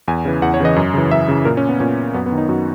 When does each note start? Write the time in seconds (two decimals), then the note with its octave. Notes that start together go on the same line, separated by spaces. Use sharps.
0.08 E2 G#5
0.25 C#3 E3
0.42 E2 F#5
0.54 C#5
0.60 C#3 E3 D#5
0.76 F#2
0.94 C#3 E3
1.11 F#2 E5
1.28 C#3 E3
1.45 A#2 A#4
1.57 C#4
1.69 B3
1.80 A#2 C#4
2.14 F#2 B3
2.26 B3
2.32 D#3
2.38 D#4
2.49 F#2 F#4